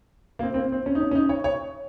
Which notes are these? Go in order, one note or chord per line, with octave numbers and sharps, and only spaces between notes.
A#3
C4
C4
A#3
C4
C#4
D#4
C#4
C#4
D#4
C#5
C#5